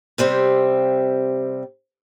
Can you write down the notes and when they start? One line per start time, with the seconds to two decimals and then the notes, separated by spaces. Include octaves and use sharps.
0.18 C3 G3 C4